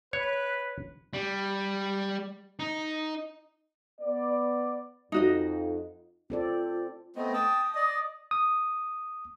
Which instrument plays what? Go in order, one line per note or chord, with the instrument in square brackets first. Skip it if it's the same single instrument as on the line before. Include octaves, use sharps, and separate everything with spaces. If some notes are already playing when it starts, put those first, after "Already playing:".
[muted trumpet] B4 [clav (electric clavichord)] C#5 [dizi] F#6
[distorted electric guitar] G3
D#4
[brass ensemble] B3 D5
[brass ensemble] F2 [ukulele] D#4 F#4 D#5
[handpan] C4 A4 D5 [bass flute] F4
[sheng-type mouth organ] A3 B3 C4 [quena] D#5
[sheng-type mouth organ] G5 A5 [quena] D#6
[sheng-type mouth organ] D5 D#5
[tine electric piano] D#6